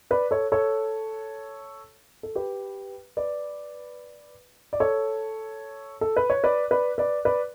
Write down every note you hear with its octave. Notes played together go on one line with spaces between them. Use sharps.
B4 D5
A4 C#5
A4 C#5
A4
G4 B4
B4 D5
D5
A4 C#5
A4
B4
C#5
B4 D5
B4 D5
B4 D5
B4 D5